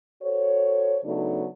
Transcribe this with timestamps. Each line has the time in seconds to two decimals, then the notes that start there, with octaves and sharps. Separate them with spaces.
0.22 F#4 A4 C5 C#5
1.05 C#3 F#3 A3 B3 D4 D#4